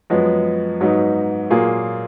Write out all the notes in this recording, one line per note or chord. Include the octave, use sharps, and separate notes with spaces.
F#2 F3 G#3 B3
G#2 F#3 B3 D#4
A#2 F#3 A#3 F4 G#4